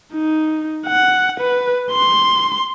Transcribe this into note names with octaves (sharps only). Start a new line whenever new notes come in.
D#4
F#5
B4
C6